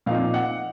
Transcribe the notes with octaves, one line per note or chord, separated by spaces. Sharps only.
A#2 F3 C4 D#4 F5
F#5